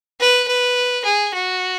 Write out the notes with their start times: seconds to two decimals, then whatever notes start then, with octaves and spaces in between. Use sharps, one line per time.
0.20 B4
0.48 B4
1.05 G#4
1.34 F#4